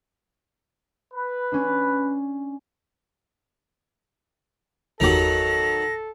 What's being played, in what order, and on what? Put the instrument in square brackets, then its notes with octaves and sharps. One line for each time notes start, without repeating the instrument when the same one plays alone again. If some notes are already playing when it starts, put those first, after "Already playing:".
[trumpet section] B4
[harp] C#4 D4
[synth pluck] G1 E2 G4 [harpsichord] D#3 F#3 F#4 [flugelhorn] A4 [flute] A#6